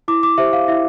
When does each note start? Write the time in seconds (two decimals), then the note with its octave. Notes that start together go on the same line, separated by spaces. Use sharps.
0.08 E4 D6
0.23 D6
0.38 G4 C5 E5
0.53 F5
0.68 E4 E5